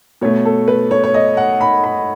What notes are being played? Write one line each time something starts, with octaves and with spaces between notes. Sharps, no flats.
B2 A3 C#5
A4
B4
C#5
C#5
D#5
F#5
B5
B5